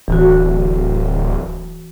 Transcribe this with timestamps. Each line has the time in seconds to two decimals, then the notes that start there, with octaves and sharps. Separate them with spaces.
0.08 D1 E3 F#4